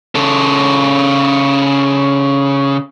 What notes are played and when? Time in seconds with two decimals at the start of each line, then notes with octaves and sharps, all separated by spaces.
0.15 C#3 A4